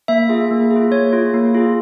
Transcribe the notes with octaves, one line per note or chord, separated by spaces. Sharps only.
A#3 E5
F4 G#4
A#3
G#4
F4
A#3 C#5
F4 G#4
A#3
F4 G#4